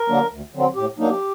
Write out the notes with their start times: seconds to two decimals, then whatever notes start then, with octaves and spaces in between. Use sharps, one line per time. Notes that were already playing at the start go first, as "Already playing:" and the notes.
Already playing: A#4
0.08 D3 F#3 A#3 D4
0.31 D2
0.54 D3 F#3 C4
0.75 A2 G4
0.99 F#3 A#3 D4 D#4
1.10 G4